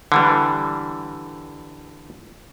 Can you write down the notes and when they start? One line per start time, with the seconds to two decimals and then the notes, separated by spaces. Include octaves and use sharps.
0.12 D3 E3 G3